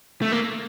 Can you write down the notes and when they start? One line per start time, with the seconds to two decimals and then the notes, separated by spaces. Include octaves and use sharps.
0.22 A3
0.32 A#3